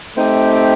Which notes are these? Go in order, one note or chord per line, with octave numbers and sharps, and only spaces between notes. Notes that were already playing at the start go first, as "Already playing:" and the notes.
A3 C4 D#4 G4